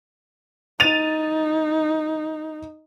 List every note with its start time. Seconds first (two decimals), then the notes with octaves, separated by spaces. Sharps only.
0.80 D#4 A6 D#7 F7